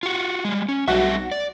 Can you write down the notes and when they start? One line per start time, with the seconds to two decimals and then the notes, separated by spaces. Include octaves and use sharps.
0.03 F4 F#4
0.45 G3 G#3
0.68 C#4
0.88 B1 G3 A3 F#4 E5 A#6
1.31 D5